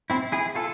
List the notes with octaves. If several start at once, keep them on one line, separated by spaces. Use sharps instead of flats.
C4 E4
E4 G#4
F4 A4